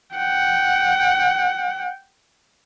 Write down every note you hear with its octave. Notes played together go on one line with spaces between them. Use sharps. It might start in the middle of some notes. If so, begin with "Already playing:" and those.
F#5 G5